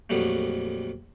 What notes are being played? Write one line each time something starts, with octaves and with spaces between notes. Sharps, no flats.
A#1 F2 F#3 G3 A3